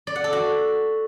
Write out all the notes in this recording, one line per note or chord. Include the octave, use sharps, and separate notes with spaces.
D5
F#5
A4
F#4